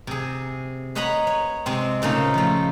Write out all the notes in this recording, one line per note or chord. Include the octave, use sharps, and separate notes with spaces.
C3 G#4
B4 C#5 D#5 F#5 A#5 B5
C#5
C3 G#3 C4
A#2 C#3 A3 D#4 A5
F3 A3